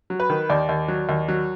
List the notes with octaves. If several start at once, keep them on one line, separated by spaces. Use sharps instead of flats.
F#3
B4
D#3
D#2 D5
D#2
F#3
D#2
F#3